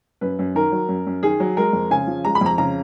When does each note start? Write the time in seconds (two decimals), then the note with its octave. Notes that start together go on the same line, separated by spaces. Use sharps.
0.21 F#2 B4
0.39 F#2
0.55 D#3 A#4
0.72 F#3
0.89 F#2
1.07 F#2
1.23 D#3 G#4
1.40 F#3
1.57 G#3 A#4
1.73 F2
1.91 C#3 G#5
2.07 F3
2.25 G#3 A#5
2.35 B5
2.41 F2 A#5
2.58 C#3 A#5